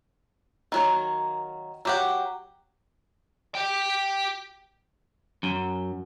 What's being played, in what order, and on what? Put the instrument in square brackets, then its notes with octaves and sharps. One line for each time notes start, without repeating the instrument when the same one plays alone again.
[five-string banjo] D#3 F#3 A#3
F#3 G4 F#5
[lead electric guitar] G4 G5
[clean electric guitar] F#2